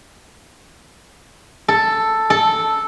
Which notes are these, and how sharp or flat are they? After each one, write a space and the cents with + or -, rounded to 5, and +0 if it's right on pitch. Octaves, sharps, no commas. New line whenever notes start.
A4 +5
A4 -5